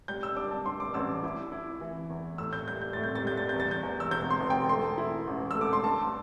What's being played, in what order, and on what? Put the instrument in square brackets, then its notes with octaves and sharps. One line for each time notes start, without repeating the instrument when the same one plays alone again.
[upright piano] G3 G6
E6
D4 D6
A5
G2 C6
D6
A1 E6
D6
E4 D6
E4
E3
E2
A2 E6
G6
G3 G6
G6
A2 A6
G6
A6
G3 G6
A6
E2 G6
A6
G6
E2
E6
E1 G6
C6
E1
G5
A3 C6
E4
A1
A3 E6
D6
C6
G2 A5